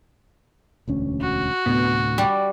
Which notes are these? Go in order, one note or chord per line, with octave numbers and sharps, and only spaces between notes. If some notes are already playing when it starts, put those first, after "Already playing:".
E1 D2 C#4
F#4
D2 A2 C3 B3
G3